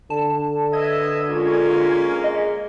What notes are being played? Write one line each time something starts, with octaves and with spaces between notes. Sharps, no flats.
D3 A5
B4 D#5 E5 G#6
G#3 A#3 C#4 F4
G#4 D#5